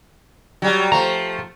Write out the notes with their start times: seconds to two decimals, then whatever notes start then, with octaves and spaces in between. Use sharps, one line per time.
0.62 F#3 G3
0.92 F3 A3 A#5